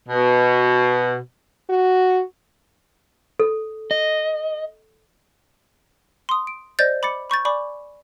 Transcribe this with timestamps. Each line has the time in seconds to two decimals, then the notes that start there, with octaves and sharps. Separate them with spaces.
0.09 B2
1.70 F#4
3.40 A4
3.91 D#5
6.29 C6 D#6
6.47 D7
6.79 C5 D5 D#5 G6 A6 A#6
7.03 B5 D6 A6 C#7
7.30 B5 C#6 G6 A6
7.45 D5 G#5 B5 C#6 D6